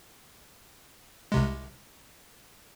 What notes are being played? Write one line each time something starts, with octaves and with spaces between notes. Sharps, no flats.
C2 C3 G#3